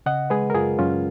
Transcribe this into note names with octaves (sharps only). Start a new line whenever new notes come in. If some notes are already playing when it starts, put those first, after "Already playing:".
C#3 D#5 F#5
G#3 G#4 B4
A#4
F#2 F4 G#4
F#2 C#4 F4